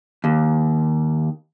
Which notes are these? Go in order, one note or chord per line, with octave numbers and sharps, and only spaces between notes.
D#2